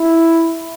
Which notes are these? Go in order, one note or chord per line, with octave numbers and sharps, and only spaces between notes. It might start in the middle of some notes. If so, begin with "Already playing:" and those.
Already playing: E4